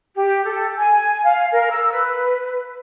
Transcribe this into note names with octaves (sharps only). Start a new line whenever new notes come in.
G4
A4
G#5
F5
A#4
E6
B4